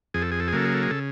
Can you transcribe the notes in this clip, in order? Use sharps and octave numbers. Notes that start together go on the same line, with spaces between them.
F2 G#4
A4
G#4
A4
G#4
C#3 F#3 A#3 A4
G#4
A4
G#4
C#3 A4